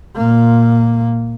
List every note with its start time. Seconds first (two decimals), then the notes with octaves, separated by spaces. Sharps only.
0.16 A#2 A#3